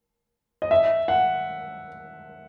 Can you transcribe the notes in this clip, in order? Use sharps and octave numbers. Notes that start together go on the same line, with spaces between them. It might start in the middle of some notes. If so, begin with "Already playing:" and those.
D#5
E5
F#5